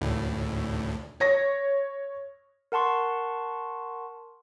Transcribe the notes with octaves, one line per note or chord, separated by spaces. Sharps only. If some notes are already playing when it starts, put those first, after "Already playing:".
D2 A2
C#5 A#6
A#4 F#5 A5 C6 C#6